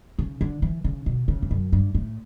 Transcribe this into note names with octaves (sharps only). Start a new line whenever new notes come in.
C#3
D3
E3
C#3
B2
C#3
E2
F#2
G2
A2